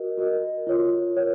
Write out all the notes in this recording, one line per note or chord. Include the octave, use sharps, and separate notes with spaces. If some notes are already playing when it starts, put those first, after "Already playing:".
Already playing: F#4 A#4 D#5
F#4 A#4 D#5
F4 A#4 C#5
A#4 C#5